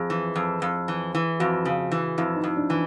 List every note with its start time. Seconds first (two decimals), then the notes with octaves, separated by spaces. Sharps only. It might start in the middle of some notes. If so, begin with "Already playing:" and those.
Already playing: F2 G#4
0.10 E3
0.36 F2
0.62 F2
0.88 E3
1.15 E3
1.40 F2 F#4
1.65 C#3
1.92 E3
2.18 F2 E4
2.37 D#4
2.44 F2
2.57 D4
2.70 E3